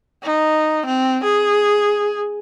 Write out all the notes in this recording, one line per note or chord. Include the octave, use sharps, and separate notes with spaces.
D#4
C4
G#4